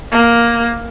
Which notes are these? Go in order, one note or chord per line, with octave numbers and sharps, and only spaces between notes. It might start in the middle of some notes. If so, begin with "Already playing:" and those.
A#3